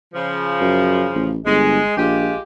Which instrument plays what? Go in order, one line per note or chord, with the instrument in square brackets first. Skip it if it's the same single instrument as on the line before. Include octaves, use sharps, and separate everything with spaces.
[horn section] C#3 F3
[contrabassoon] F#2
A1
[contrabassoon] G1 [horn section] G#3
[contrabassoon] A#1 [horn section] G#3 F4 G4